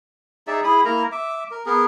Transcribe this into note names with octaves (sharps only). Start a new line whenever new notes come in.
D#4 G#4 D5 E5
E4 G#4 B5 D#6
A#3 E4 A#4 A#5
E5 D6
A#4
B3 G#4 A#4